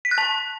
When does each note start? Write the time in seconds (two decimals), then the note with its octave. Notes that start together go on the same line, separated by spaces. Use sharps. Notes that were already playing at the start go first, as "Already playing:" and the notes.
0.05 B6
0.11 F#6
0.18 A5